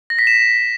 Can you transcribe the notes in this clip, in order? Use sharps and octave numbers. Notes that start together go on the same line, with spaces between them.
A#6
B6
E7